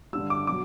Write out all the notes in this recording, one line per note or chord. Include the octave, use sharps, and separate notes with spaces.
G2 D3 G3 E6
D6
B2 F#3 D6